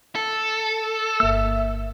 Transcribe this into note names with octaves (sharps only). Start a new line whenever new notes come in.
A4
G1 A#3 E5 E6